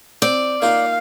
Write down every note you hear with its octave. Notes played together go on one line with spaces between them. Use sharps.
C4 D5 G5
A#3 D#4 F4 F5